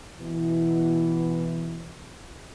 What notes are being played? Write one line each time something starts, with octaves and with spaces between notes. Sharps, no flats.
B2 E3